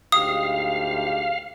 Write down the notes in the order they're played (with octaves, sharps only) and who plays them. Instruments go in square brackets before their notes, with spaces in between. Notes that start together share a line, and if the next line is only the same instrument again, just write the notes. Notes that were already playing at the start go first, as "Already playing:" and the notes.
[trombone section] D2 G#2 G4 [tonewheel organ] F5 [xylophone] D#6